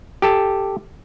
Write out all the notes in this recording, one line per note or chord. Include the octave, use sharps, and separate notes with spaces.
G4 A4 A5